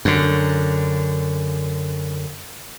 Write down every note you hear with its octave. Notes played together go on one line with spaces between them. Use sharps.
F#2 D3